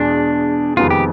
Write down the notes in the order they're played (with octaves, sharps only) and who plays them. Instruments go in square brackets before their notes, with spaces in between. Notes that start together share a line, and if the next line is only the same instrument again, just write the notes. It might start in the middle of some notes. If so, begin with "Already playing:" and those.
Already playing: [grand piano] E2 B2 G#3 [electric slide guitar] D4
[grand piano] F2 C3 D#3 G#3 B3 [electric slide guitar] F4
[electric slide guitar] G4